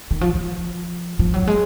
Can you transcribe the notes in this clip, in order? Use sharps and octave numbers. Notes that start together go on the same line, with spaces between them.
D#3
F3
F3
F3
F#3
G#3